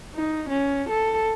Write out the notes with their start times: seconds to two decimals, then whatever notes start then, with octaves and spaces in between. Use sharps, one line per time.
0.15 D#4
0.49 C#4
0.90 A4